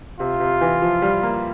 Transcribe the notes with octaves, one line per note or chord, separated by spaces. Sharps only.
C3 F4
C3
E3
F3
G3
A#3